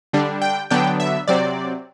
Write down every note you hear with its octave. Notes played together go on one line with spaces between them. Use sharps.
D3 G3 D4
G5
D3 F#3 B3 D4 G5
E5
C3 F#3 C4 D5